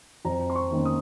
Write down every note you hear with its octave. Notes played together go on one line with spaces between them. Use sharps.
F2 A#5
C6
C#6
D#3 A#3 C#4
D#6